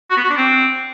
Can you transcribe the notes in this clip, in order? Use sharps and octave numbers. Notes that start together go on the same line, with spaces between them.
F#4
B3
F#4
D4
C4